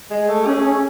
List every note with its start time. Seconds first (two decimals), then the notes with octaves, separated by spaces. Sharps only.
0.10 G#3
0.28 A3
0.46 C#4 G#4
0.63 C#4